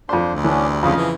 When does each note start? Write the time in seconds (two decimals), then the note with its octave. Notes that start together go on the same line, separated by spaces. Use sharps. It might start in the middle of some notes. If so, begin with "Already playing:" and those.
0.09 F2 D4 C5 C6
0.32 D2
0.44 E3 B3 C#4 D4
0.70 G3
0.83 F2 C#3 F3 D#5 F5
0.96 E3